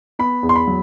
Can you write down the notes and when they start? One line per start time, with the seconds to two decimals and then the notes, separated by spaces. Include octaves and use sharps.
0.19 B3 B5
0.43 E2
0.49 C6
0.56 B5
0.68 F#3